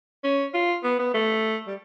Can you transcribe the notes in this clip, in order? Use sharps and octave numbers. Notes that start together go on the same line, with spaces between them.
C#4
F4
B3
B3
A3
G3